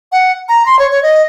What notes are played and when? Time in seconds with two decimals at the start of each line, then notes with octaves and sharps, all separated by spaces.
0.12 F#5
0.49 A#5
0.66 C6
0.79 C#5
0.91 C#5
1.03 D#5